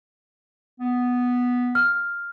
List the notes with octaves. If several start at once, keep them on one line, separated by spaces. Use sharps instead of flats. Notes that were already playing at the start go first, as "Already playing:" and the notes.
B3
F6